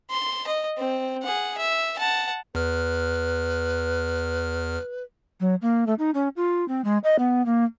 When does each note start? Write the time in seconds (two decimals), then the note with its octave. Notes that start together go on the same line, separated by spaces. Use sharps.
0.11 C6
0.47 D#5
0.78 C4
1.23 G#4 F#5
1.58 E5
1.99 F#5 A5
2.55 E2 B4 F6
5.40 F#3
5.62 A#3
5.87 A3
5.99 D#4
6.14 C#4
6.36 F4
6.68 C4
6.84 G#3
7.04 D#5
7.19 B3
7.46 A#3